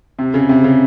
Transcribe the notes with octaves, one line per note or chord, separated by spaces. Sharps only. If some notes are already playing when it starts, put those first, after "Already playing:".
C3
C#3
C3
C#3